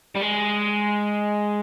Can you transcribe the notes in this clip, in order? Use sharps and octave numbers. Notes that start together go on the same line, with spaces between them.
G3
G#3